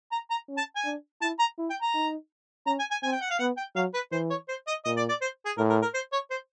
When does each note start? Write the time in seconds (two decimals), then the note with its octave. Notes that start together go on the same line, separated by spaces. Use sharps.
0.12 A#5
0.30 A#5
0.49 C#4
0.57 A5
0.76 G#5
0.84 D4
1.21 E4 A5
1.39 A#5
1.58 E4
1.70 G5
1.82 A#5
1.94 D#4
2.66 C#4 A#5
2.79 G#5
2.91 G#5
3.03 C4 G#5
3.12 G5
3.21 F#5
3.30 F5
3.39 B3 F#5
3.57 G5
3.75 F#3 F5
3.94 B4
4.12 E3 C5
4.30 C#5
4.48 C5
4.67 D#5
4.85 A#2 D#5
4.97 D5
5.09 D5
5.21 C5
5.46 G#4
5.57 A2 A#4
5.70 A#4
5.82 A#4
5.94 C5
6.12 C#5
6.30 C5